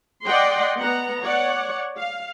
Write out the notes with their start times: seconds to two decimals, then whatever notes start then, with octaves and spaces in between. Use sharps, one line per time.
0.25 D5 D#5 F#5 G5 C6
0.78 B3 F#5 A#5
1.21 C#5 D5 F#5
1.98 F5